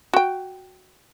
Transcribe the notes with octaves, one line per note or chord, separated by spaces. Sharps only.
F#4 G5